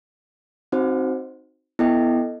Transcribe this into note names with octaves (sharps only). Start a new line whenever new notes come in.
C4 D#4 F#4 C5
B3 E4 A4 D#5 G5